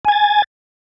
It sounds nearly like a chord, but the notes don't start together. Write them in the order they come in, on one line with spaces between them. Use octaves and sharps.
G#5 G#6 A6